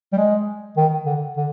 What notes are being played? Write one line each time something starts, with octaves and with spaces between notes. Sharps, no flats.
G3
G#3
D#3
D3
D3